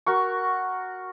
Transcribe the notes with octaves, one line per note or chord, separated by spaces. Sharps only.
F#4 A#4 C#6